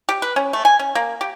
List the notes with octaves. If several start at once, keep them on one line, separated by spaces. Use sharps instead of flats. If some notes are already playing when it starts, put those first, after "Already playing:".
G4
B4
C#4
A3
G#5
C#4
A#3
G4